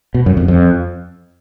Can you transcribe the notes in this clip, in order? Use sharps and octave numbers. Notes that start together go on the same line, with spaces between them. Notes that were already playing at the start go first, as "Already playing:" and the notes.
B2
F#2
F2
F2